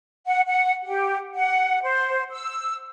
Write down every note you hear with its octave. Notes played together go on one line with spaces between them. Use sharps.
F#5
F#5
G4
F#5
C5
E6